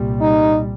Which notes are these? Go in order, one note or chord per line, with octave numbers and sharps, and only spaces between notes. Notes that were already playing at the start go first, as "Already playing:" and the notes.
Already playing: C2 A#2 G3
D#4